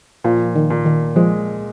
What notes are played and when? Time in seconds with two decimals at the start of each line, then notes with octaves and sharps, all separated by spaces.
0.24 A#2 F3
0.56 D#3
0.70 A#2
0.85 D#3
1.16 F3 G#3